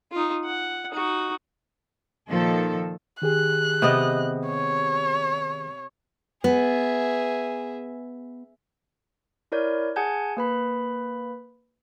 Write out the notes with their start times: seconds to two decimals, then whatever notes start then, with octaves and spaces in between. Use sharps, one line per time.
0.12 D#4 F4
0.45 F#5
0.92 D#4 F#4
2.28 A#2 D#3 F3 A4
3.22 D#3 G4 G#4 F#6
3.82 C3 B3 D#5
4.48 C#5
6.44 B3 G#4 E5
9.52 E4 A#4 C#5 D5 G6
9.96 G#4 F#5 G#5 A5 G6 G#6
10.37 A#3 B4 B5